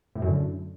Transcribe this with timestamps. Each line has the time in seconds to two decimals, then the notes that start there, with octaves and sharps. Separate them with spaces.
0.15 A2
0.22 F#2
0.28 D3